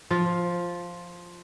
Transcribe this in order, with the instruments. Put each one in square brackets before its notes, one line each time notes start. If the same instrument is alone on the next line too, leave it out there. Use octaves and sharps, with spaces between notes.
[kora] F3 F4